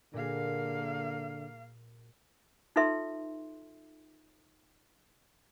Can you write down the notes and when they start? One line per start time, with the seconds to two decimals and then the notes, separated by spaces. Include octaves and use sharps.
0.14 A#2 D3 A#3 F#4 G#4 F5
2.76 D#4 F4 A4 B4 E5 C6